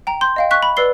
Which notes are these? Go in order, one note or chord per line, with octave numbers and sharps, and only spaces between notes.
G5 A#5
C6 G6
D#5 F5 G5
C#6 F#6 B6
B5
B4 D5 E6 C7 G7